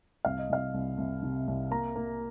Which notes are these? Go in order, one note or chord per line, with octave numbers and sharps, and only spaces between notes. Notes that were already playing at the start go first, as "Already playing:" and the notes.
C2 F5
D#5
C2 F5
C2
C2
C3
C2
A#3 A#5
A#3